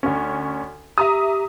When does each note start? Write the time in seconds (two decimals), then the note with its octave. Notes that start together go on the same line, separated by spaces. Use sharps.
0.03 D2 C#4
0.98 G4 E5 A#5 D#6